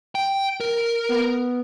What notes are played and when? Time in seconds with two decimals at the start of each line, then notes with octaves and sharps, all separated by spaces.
0.15 G5
0.60 A#4
1.09 B3